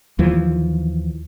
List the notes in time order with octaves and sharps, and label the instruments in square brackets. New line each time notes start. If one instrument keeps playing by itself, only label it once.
[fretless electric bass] D#2 E3 F3